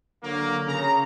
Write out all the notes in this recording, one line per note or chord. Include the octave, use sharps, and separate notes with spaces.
D3 F#3 A#3
C#3 A#5